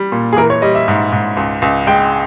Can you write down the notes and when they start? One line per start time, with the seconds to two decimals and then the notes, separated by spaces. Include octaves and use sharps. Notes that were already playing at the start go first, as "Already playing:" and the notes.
Already playing: G3
0.12 A#2
0.33 G#4
0.37 E3 A#4
0.50 C#5
0.62 G3 D#5
0.75 E5
0.88 G#2
1.12 G#2
1.37 C#2
1.62 C#2
1.87 G#3 G5